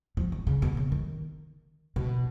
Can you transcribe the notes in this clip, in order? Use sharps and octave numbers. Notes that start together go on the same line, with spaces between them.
F3
D#3
C#3
B2
C#3
D#3
B2